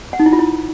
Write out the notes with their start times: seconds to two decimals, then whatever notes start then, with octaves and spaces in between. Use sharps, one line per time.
0.13 F#5
0.20 D#4
0.26 E4
0.33 F4
0.39 E4